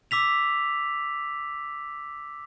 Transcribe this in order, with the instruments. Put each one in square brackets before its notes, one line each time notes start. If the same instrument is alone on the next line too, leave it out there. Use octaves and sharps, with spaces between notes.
[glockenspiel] D6 E6 B6 F7